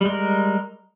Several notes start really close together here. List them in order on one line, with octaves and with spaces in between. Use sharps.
G3 G#3 A#4